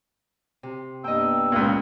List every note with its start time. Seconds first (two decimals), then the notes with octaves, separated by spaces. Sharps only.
0.63 C3
1.04 G2 A#3 B3 D#5 G5 E6
1.52 C#2 A#2